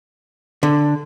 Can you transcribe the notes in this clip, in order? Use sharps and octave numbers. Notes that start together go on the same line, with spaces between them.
D3